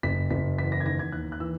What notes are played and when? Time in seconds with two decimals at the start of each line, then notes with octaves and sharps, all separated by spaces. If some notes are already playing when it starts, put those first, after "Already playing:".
0.03 F#1 B6
0.31 F#1 B6
0.58 E2 B6
0.72 A#6
0.80 G#6
0.85 D#3 A#6
0.99 G#6
1.12 D#2 F#6
1.32 F#6
1.40 E3 E6